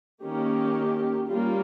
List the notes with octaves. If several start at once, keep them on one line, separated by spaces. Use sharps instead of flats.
D#3 A#3 C#4 G4
G3 A#3 C#4 F4